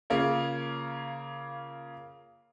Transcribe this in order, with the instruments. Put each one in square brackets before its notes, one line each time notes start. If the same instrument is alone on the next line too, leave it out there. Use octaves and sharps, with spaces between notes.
[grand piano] C#3 A#3 F4 C#5